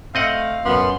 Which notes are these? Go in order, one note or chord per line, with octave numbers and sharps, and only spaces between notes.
A3 C4 D#5 F5 F#5
F#2 B3 C6